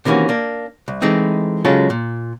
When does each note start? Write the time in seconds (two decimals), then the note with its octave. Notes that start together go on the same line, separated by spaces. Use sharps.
0.05 C3 D#3 E3 A#3 C#4 F#4
0.29 A#3 D4
0.88 C2
1.02 E3 G#3 A3 C4 D#4
1.65 C#3 F#3 G#3 F4 A4
1.90 A#2